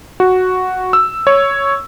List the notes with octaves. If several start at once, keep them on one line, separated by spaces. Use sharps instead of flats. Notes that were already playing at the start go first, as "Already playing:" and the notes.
F#4
E6
C#5